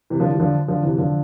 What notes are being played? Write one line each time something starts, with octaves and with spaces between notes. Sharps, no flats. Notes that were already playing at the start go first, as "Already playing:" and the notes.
C3 E3
D3 F3
E3 G3
D3 F3
D3 F3
C3 E3
D3 F3